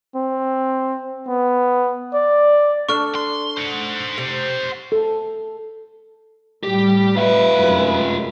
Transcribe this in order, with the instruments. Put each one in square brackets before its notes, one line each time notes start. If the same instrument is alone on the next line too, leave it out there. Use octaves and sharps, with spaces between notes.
[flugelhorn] C4
B3
D5
[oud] D4 A4 [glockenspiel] C#6 F6
[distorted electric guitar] C6
C5 F#5
[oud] C3
[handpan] A4
[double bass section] A2 G3 [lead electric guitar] G4
[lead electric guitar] F4 E5 [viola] B4
[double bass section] F1 F#2 G#3